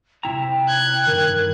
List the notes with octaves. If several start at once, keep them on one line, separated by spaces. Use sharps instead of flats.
C3 E4 G5 A#5
F#6 G#6
G2 D#3 A#4